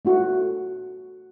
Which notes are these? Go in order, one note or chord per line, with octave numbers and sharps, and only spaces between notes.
A3 E4 F#4